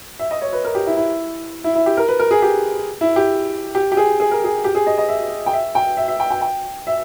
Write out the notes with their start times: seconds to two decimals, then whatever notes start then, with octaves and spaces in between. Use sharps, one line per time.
0.19 E5
0.31 D#5
0.41 C#5
0.53 B4
0.64 A#4
0.75 G4
0.87 E4
0.97 E4
1.64 E4
1.75 E4
1.86 G4
1.97 A#4
2.08 B4
2.19 A#4
2.31 G#4
2.42 G4
3.01 E4
3.16 G4
3.75 G4
3.92 G4
3.97 G#4
4.20 G#4
4.31 A#4
4.44 G#4
4.64 G4
4.75 G#4
4.87 D#5
4.98 D#5
5.08 E5
5.46 G5
5.53 E5
5.75 G5
5.97 E5
6.08 E5
6.20 G5
6.31 G5
6.41 G5
6.87 E5